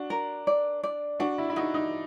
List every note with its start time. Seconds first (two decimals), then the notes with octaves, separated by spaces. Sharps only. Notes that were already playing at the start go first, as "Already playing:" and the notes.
Already playing: D4 F#4
0.10 A#4
0.47 D5
0.83 D5
1.20 D4 F#4
1.38 E4
1.50 E4
1.56 D#4 F#4
1.74 D#4